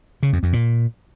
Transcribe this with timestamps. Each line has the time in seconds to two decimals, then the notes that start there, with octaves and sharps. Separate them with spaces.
0.23 C#3
0.33 F2
0.43 F2
0.53 A#2